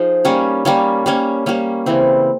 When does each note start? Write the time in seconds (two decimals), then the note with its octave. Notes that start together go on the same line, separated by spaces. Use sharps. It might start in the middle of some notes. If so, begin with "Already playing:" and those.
Already playing: F3 D#4 G#4
0.25 G3 A#3 C#4
0.65 G3 A#3 C#4
1.06 G3 A#3 C#4
1.46 G3 A#3 C#4
1.86 C#3 E3 G3 C4